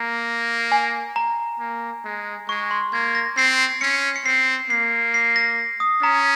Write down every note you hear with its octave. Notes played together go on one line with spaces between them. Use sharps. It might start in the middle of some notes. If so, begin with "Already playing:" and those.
Already playing: A#3 A#5
G#5
A#5
A#3
G#3
G#3 C#6
C6
A#3 G#6
A#6
C4 C7
C#4 C#7
C#7
C4 C7
A#3 C7
C7
A#6
D#6
C#4 A#5